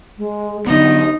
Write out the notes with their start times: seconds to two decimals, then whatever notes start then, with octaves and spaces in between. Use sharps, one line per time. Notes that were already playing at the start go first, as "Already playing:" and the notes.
0.18 G#3
0.67 D3 F#3 B3 D#4